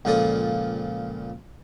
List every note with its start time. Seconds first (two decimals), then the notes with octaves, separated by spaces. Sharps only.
0.05 C#2 A#2 F3 A4 D5 D#6